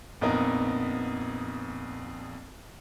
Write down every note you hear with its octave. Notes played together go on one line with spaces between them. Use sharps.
A#1 F2 B3 D#4 A#4